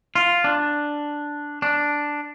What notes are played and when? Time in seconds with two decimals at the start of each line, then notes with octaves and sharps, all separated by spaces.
0.15 F4
0.44 D4
1.62 D4